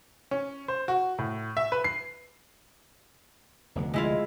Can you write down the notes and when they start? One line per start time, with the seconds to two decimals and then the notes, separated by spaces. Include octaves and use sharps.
0.31 C#4
0.68 C5
0.88 F#4
1.18 A2
1.57 E5
1.72 B4
1.84 C7
3.75 F1 D2 D3
3.94 G#3 E4 F4